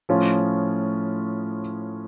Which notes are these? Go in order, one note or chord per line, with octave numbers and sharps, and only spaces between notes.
A2 F3 C#4 F4